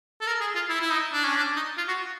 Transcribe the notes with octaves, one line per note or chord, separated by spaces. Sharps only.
A4
A#4
G#4
F4
E4
E4
D#4
D4
C#4
D4
D#4
F4
F#4